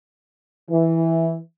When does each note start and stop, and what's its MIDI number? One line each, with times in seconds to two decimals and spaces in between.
0.70 1.37 52